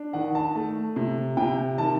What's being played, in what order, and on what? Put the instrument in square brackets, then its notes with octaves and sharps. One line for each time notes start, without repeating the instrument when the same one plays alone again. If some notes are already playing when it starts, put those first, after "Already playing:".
Already playing: [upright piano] D4
D#3 F#5
A5
A3
C3
C3 G5
D#3 A5